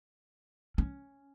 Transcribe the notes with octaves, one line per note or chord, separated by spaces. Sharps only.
C#4